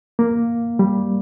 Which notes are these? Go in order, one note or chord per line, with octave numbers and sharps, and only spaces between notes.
A#3
G3